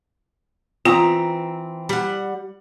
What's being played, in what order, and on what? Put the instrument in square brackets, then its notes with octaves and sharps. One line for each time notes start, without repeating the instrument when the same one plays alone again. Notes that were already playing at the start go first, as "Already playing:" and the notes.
[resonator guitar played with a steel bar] E3 C4 [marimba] F4 [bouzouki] A#5
[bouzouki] G3 F#5